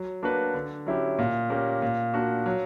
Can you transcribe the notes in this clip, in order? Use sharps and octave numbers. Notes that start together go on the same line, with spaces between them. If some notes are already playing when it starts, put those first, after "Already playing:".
Already playing: F#3
A#3 D4 F#4 B4
D3
F#3 C#4 E4 G4
A#2
A#3 C#4 G4
A#2
A#3 D4 F#4
F#3